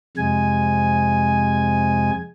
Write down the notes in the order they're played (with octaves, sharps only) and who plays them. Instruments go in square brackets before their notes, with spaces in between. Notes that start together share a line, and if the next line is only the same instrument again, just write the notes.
[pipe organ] F2 C3 G#3 G#5